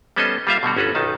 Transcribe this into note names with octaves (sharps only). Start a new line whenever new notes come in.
G3 B3 C#4 A4 C5 D#5
G3 A#3 F4 C5 E5 F5
B2 D3 G3 F#4
G1 C#4 F#4 A4 B4
B1 D#3 D#4 A5